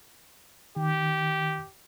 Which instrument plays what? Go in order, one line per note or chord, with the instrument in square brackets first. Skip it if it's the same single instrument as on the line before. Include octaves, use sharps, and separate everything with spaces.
[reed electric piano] D#3 [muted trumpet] G4